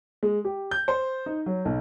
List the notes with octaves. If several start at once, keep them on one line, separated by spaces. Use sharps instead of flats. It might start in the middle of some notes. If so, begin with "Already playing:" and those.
G#3
G4
G6
C5
D#4
F#3
B1